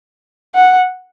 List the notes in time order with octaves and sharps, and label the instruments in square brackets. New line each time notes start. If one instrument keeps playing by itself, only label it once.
[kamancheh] F#5